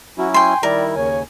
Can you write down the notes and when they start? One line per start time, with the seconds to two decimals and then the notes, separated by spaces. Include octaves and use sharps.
0.18 F#3 C#4 E4 F#4
0.34 G5 G#5 C6
0.63 D#3 G3 E4 A#4 D5
0.96 D#2 C#3 C#5 G#5